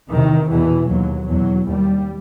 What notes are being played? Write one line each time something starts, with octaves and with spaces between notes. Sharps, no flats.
E2 C3 D#3
E2 B2 E3
D#2 F#3
E2 B2 F#3
D#2 G3